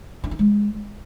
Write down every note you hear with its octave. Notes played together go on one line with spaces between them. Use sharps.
D4
D#4
G#3